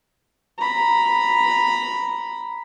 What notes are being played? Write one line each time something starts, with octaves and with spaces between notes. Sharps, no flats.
A#5 B5